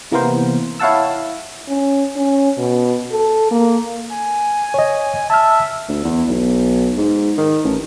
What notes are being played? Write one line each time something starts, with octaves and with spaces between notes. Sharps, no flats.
C3 E3 A#3 B3 A#4 C5
E4 C#5 F5 F#5 A5 E6
C#4
C#4
B2
A4
A#3
G#5
C#5 D#5
E5 A5 F6
D2
E2
B1
G#2
D#3
A1